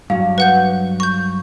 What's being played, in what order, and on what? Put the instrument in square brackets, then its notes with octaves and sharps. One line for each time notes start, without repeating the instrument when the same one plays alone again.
[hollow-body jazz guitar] G2 F#3 [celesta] F5
[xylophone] B4 F#5 G6
C#6 G6